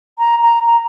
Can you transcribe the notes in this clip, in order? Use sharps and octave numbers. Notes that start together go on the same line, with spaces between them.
A#5
A#5
A#5